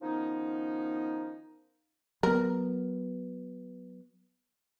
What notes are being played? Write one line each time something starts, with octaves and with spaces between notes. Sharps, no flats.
D#3 F3 B3 C#4 D#4
F#3 B3 A#4